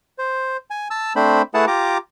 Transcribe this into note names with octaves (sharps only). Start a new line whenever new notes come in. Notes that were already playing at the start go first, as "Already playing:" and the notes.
C5
G#5
A5 E6
A3 C4 D4 C5 B5
A3 E4 G#4 B4 F#5 A5
F4 G4 A#5 D6